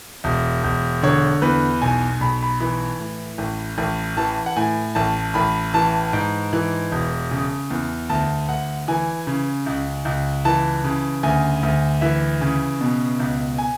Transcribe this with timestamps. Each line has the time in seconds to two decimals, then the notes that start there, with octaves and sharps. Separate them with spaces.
0.24 E1
0.64 E1
1.03 D3 C#5
1.42 E2 B4
1.81 B1 G#5
2.21 B1 B5
2.43 B5
2.60 E3 B5
3.00 A2
3.38 A1
3.78 A1
4.17 E3 A5
4.46 F#5
4.56 A2 G#5
4.95 A1 A5
5.34 A1 B5
5.74 E3 A5
6.13 G#2
6.53 E3
6.92 E1
7.31 C#3
7.70 E2
8.09 D2 A5
8.48 D2 F#5
8.88 E3 G#5
9.27 C#3
9.66 C#2
10.05 C#2
10.45 E3 A5
10.84 C#3
11.23 D2 G#5
11.63 D2
12.01 E3 E5
12.41 C#3
12.81 B2
13.20 C#2
13.58 G#5